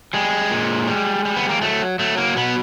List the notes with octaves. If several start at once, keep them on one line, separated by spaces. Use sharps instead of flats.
G3 G#3
A#2
G3
G3
B3
A#3
F#3 A3
F#3 A3
A#3
B2 B3